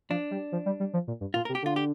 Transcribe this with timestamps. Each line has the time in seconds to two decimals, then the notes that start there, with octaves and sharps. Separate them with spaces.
0.10 F3 D4
0.31 G3
0.52 F3
0.66 G3
0.80 G3
0.93 F3
1.08 A#2
1.21 G2
1.34 A#2 F4
1.45 A#4
1.49 C3
1.55 G4
1.62 D3 F4
1.76 G4